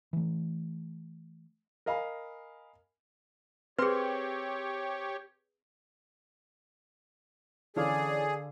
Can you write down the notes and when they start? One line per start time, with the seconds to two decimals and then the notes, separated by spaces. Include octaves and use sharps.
0.13 E3 A3
1.86 A#4 D#5 F5 G#5 B5
3.79 C4 G4 G#4 B4 C#5 C6
7.76 D3 E3 C#4 G#4 A4 D5 F5 D6